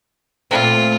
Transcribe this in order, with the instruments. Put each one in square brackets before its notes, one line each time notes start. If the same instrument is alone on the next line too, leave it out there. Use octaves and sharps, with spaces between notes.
[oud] A#2 A3 C4 [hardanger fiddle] F4